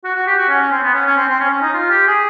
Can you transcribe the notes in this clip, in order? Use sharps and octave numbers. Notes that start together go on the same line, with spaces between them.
F#4
F#4
G4
F#4
C#4
C#4
C4
B3
C#4
C#4
C4
C4
C#4
C#4
D#4
F4
G4
G#4